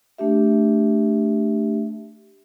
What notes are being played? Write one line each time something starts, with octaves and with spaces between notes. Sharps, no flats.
A3 D4 G4 E5